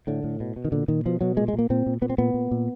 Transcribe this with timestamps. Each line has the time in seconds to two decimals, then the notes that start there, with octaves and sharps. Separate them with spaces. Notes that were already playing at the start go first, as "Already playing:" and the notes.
0.07 A2 D3
0.24 A2
0.40 B2
0.56 B2
0.65 D#3
0.72 A#2 D3
0.88 A#2 D#3
1.06 B2 F3
1.21 B2 F#3
1.37 A#2 G#3
1.48 G#3
1.53 A#2
1.59 A#3
1.70 A#2 C4
1.86 A#2
2.02 A#2 B3
2.10 C4
2.18 A#2 B3
2.34 A#2
2.51 A#2